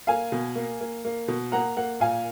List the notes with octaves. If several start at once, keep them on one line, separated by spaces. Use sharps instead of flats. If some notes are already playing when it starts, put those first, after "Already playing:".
A#3 F5 G#5
B2
A#3
A#3
A#3
B2
A#3 F#5 A#5
A#3 F#5
A#2 F5 G#5